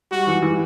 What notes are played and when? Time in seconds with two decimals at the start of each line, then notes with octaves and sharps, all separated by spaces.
0.11 G3 F#4
0.27 E3
0.43 E3